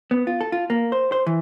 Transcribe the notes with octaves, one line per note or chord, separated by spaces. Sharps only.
B3
F4
A4
F4
A#3
C5
C5
E3